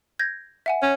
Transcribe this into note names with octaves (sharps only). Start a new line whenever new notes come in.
G6 G#6 A#6
E5 F#5 G#5
C#4